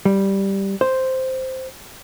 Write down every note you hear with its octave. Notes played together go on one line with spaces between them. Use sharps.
G3
C5